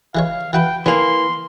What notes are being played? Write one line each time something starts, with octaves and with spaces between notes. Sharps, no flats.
E3 G#3 C#5 F5
E3 F#4 B4 G5
E3 A#3 D4 C6